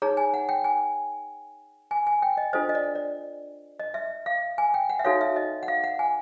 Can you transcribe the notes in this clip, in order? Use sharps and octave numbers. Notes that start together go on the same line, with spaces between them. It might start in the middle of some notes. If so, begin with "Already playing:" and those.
D#4 G#4 C#5 A#5
G#5
F#5
G5
G#5
G#5
G#5
G5
D#5
D4 F4 A4 C5 D#5
D#5
D5
D5
D#5
E5
F5
G#5
G5
F#5
E5
D#4 F#4 A4 C#5 F5
E5
D#5
F#5
F5
F#5
G#5